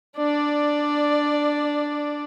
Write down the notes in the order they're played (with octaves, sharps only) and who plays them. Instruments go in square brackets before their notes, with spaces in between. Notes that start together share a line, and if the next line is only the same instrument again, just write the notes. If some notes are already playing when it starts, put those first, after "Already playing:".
[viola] D4 D5